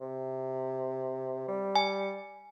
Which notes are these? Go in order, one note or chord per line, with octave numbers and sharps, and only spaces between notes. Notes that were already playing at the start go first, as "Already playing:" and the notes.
C3
G3
G#5